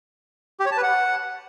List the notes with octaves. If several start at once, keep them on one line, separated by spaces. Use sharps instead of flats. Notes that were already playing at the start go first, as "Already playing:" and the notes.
G4
C#5
A5
B4
F#5